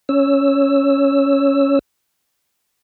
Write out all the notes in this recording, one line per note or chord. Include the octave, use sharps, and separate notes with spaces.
C#4 C#5 E6